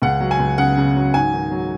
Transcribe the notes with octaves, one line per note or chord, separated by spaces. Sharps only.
C#2 F#5
F#3
G#5
C#2
C#3 F#5
C#3
F#3
G#2 G#5
D#3
F#3